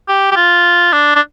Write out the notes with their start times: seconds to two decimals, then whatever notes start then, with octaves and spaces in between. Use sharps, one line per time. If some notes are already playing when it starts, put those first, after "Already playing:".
0.08 G4
0.31 G4
0.36 F4
0.92 D4
1.15 D4